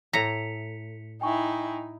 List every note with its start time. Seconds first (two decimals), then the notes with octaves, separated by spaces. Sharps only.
0.13 A2 A#5 B6 C#7 F7
1.21 D#4 E4 G5 G#5 C#6